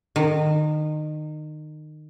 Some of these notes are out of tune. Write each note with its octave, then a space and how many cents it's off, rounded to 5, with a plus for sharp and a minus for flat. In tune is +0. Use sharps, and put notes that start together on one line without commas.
D#3 -25